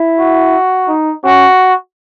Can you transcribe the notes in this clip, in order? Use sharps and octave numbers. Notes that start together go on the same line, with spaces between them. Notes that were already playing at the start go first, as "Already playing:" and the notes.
Already playing: E4
F#4
D#4
C#4 F#4